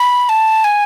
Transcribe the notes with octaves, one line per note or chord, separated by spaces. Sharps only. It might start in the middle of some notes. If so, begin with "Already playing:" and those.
Already playing: B5
A5
G#5